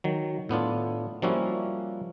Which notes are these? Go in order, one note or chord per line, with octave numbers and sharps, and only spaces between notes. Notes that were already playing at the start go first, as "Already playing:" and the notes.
D#3 F#3
A2 B3 D4 F4
F3 G3 A#3 C#4 E4 F#4